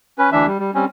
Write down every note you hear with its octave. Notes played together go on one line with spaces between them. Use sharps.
C#4 B4
D2 E3 D4 E5
G3
G3
G3 C4 C#4